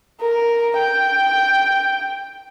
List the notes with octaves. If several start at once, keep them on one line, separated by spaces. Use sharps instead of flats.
A#4
G5